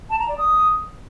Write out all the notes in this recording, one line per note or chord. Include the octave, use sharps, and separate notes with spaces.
A5
A#5
D5
D#6